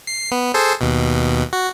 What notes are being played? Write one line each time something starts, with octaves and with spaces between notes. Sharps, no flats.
C7
B3
G#4 A4 C5
D#2 B2
F#4